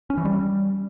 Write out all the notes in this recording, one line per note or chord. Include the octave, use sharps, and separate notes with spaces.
C#4
E3
G3